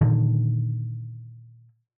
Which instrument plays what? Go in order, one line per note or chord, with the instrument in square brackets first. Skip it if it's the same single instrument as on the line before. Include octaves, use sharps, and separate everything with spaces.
[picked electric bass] A#2 D3 D#3